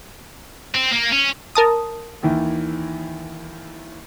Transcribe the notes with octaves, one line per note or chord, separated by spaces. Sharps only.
C4
A#3
C#4
A#4 A5 D#6
D#2 D#3 E3